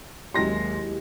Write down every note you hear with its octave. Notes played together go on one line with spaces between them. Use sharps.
D#2 F#3 G#3 E4 G4 C6 A#6